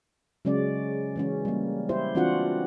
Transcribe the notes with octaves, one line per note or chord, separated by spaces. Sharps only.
C#3 F#3 G#3 C#4 D5
E3 G#3 C#4
G3 A#3
E4 G4 C5
E3 C4 D4 F4 F#4 F#5